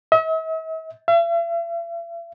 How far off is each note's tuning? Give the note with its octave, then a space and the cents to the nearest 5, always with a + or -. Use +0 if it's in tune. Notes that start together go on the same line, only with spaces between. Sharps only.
E5 -45
E5 +45